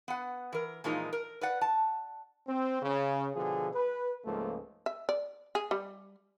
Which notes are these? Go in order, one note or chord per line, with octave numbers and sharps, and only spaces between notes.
B3 F#5
E3 A#4
A#2 E3 F3 G#3 A#3 D#4
A#4
B4 D5 F#5
A5
C4
C#3
B2 D3 F3 G#4
B4
C#2 G#2 F3 A3 A#3
E5
D5
G#4
G3